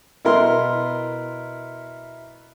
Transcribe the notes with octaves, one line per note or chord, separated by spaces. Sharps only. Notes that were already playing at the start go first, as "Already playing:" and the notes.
B2 E4 A#4 C6